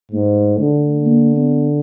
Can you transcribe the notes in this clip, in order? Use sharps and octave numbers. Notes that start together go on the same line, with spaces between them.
G#2 A3
D3 A3
A#3
B3